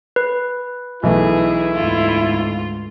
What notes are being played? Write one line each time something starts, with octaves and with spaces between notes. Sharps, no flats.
B4
B1 E3 A3 E4 G#4
D2 G#2 F4